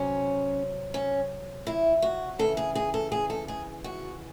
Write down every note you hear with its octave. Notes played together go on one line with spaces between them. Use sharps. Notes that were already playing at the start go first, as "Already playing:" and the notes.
Already playing: C3 F#3 C#4
C#4
E4
F#4
C#3 E3 A4
G#4
G#4
A4
G#4
A4
G#4
F#4